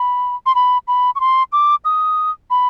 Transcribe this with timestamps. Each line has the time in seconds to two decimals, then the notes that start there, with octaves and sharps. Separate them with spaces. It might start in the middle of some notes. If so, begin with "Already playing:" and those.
Already playing: B5
0.46 C6
0.55 B5
0.88 B5
1.15 C#6
1.20 C6
1.52 D6
1.85 D#6
2.50 B5